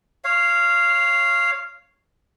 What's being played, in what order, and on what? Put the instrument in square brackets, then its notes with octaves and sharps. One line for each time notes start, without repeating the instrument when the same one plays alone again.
[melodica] C#5 F5